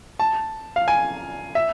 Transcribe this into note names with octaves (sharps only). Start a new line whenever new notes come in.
A5
F5
G#5
E5